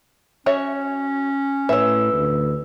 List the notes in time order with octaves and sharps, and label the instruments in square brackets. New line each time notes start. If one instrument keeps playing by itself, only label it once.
[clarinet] C#4 [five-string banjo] F#4 C#5 E5
[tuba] A2 [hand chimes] B4 E6 [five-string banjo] C#5 E5
[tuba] D2